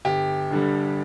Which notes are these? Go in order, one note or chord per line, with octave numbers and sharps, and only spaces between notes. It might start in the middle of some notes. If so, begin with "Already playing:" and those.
G1 G4
G2 D3 G3